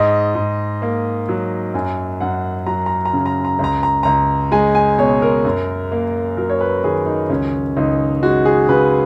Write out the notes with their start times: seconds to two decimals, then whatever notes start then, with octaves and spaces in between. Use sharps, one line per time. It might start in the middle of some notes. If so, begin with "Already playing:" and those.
Already playing: G#2 D#5
0.35 G#2
0.82 A#3
1.29 F#3
1.74 F#2 G#5
2.21 F#2 F#5
2.66 F#3 A#5
2.86 A#5
3.05 A#5
3.13 C#3
3.26 A#5
3.45 A#5
3.59 C#2 A#5
3.83 A#5
4.03 C#2 A#5
4.52 G#3 G#5
4.75 G#5
4.98 B2 C#5
5.22 A#4
5.45 F#2
5.92 A#3
6.37 F#3 A#4
6.50 C#5
6.61 B4
6.84 D#3 G#4
7.06 D#4
7.30 C#2 C#4
7.77 C#2 D#4
8.23 G#3 F#4
8.45 G#4
8.69 C#3 B4